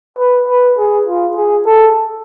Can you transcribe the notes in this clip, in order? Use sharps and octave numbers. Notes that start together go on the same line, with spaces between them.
B4
B4
G#4
F4
G#4
A4